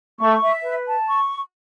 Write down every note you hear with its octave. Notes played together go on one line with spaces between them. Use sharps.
A3 C#6
E5
B4
A5
C#6